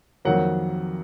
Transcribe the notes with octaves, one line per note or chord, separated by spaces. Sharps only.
F2 D#3 F#3 A#3 F#5